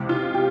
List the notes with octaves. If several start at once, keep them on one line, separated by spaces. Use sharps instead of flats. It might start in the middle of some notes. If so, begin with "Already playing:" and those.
Already playing: C#2 C3 E3
F4
G4